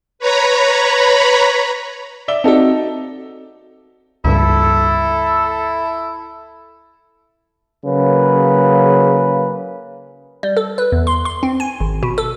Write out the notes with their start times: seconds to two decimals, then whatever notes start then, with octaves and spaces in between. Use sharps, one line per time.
0.19 B4 C#5 A#5 B5
2.28 D5 E5 G7
2.44 C4 D#4 F#4 A4 D5
4.25 C#2 G2 E4 A4
7.85 C#3 F#3 A#3 G#4 B4
10.43 G3
10.57 A4
10.78 B4
10.92 E2
11.07 C6
11.25 C6
11.43 C4
11.60 G#5
11.80 G#1
12.03 B2
12.18 A4